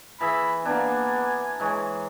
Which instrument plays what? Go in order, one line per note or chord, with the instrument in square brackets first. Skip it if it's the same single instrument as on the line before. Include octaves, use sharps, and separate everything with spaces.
[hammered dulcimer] E3 G#4 E5 [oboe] B5
[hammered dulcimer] A#3 D4 [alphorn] B3 [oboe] G#5
[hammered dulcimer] E3 G#3 C#5